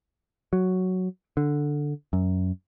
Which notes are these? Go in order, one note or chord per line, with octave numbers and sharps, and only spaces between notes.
F#3
D3
F#2